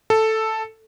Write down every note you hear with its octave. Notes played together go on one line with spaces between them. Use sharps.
A4